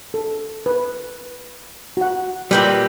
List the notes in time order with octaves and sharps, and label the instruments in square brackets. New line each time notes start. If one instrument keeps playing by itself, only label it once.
[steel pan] A4
B4
F#4 F#5
[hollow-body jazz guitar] A#2 G3 [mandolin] C4 G4 B4